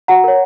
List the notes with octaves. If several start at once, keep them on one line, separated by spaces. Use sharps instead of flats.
F#4 F#5 A#5
A#4 C#5